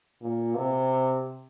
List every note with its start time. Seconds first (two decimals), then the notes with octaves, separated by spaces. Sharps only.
0.22 A#2
0.55 C3